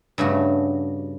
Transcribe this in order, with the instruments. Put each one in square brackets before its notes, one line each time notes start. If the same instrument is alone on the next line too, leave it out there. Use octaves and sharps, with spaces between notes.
[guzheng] G2 C#3 A3 F#4